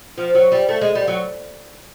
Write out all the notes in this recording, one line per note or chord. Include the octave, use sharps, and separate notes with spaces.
F3
F#3
G3
A3
G#3
G3
F#3